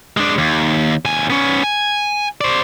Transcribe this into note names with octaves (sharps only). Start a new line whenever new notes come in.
G#3 D4
D#2
D#2 G#5
B3 C#4
G#5
C5 D5